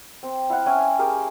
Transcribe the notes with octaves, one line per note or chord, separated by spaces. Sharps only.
C4
E4 F5 F#5
C#4 E4 G5 G#5
G4 G#4 A#4